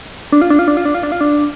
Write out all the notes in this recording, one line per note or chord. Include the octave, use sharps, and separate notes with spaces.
D4
F4
D4
F4
D4
F4
D4
F4
D4
F4
D4